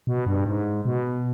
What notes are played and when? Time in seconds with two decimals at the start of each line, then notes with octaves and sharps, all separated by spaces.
0.07 B2
0.26 G2
0.46 G#2
0.85 B2